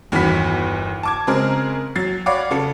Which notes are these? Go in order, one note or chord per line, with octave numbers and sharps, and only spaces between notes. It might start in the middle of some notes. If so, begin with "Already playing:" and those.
G1 E2 D#3 F#4 B5 B6
A5 D6 G#6
C#3 G#3 C4 G#4 A#4
F#3 A6 C7
C#5 D5 F5 F#5 B5 D6
C#3 A4 C#7